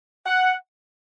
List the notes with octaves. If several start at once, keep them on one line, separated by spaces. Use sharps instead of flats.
F#5